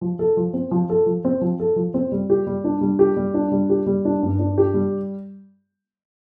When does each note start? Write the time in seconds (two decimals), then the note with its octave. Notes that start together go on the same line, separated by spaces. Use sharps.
0.01 F3
0.19 A4
0.37 F3
0.53 C4
0.71 F3
0.90 A4
1.06 F3
1.25 C4
1.41 F3
1.60 A4
1.76 F3
1.94 C4
2.12 G3
2.30 G4
2.47 G3
2.64 D4
2.81 G3
2.99 G4
3.17 G3
3.34 D4
3.52 G3
3.69 G4
3.86 G3
4.05 D4
4.23 G2
4.39 D4
4.58 G4
4.74 G3